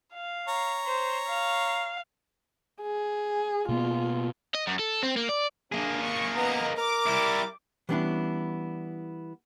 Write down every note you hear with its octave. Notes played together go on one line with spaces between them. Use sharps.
F5
C#5 A#5
C5
F5
G#4
B2 A#3 B3 F4
D#5
F#2
A4
C4
A#3
D5
A#3 D4 G#4
C#6
B3 B4 D#5 A#5
A#4 D6
G3 E4
E3 G3 B3 C#4 D4 E4